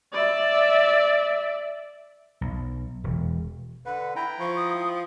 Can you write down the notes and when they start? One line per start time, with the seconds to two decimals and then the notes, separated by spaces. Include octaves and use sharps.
0.13 D5 E5
2.41 B1
3.04 E1
3.86 D3 B4 F#5
4.16 E4 G5 A#5 B5
4.40 F3 C#6
4.56 D#6